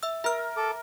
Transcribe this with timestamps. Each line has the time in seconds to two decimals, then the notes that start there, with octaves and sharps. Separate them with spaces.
0.03 E5 E6
0.24 A#4 E5 F6
0.57 A4 D6